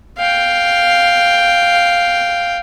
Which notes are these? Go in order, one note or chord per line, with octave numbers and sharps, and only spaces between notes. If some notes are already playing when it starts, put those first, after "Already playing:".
F5 G5